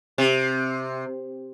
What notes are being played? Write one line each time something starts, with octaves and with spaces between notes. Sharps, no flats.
C3